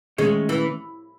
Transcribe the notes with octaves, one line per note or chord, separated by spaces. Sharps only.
D#3 G#3 A3 C#4 G#4 C#5
E3